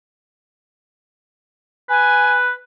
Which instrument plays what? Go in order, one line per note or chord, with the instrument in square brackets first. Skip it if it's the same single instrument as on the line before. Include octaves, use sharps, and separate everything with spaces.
[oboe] B4 [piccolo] G#5